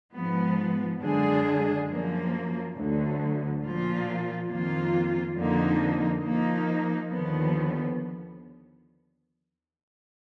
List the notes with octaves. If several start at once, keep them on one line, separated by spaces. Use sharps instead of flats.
G#2 F3 B3
F#2 D3 G#3 D4 G#4
F#2 F3 A#3
D2 D3 F#3
A#2 F3 A#3 F4
F2 D#3 A#3 F4
F2 D3 F3 A#3 D#4
F3 A#3 D#4
D#2 D3 F3 B3